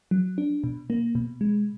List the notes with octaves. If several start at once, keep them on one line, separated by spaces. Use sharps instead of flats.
F#3
D4
B2
A#3
B2
G#3